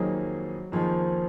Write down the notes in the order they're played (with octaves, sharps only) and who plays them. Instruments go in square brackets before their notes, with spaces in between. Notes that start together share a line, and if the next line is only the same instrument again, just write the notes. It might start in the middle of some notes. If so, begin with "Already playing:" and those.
Already playing: [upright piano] F2 D#3 A#3 D#4 G#4 [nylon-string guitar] F#3
[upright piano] F2 D#3 A#3 D#4 G#4 [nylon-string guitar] F3